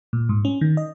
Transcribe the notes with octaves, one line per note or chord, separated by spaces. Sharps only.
A#2
G#2
C#4
D#3
D#5